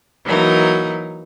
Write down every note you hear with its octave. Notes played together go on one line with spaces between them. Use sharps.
E3 F#3 A#3 D#4